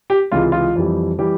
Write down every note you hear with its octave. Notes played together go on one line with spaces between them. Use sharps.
G4
C#2 C3 E3 G#3 F4
F4
F2 E3 G3
E3 G3 G4